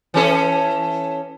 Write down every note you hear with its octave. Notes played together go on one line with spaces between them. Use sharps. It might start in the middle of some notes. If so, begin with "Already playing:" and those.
E3 C#4 A4